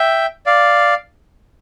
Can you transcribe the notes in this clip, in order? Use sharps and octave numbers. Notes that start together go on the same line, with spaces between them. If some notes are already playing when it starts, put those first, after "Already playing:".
Already playing: E5 G5
D5 F5